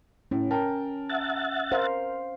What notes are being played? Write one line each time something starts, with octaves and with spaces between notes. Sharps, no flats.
A2 C#4
A#4 G5 A5
E5 F#5 A6
A#4 C5 F5